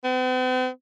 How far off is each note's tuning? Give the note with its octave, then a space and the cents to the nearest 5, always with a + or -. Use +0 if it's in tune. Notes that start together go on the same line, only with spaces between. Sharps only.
C4 -45